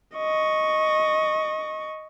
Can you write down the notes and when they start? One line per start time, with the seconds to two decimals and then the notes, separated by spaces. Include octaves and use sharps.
0.16 D#5 C#6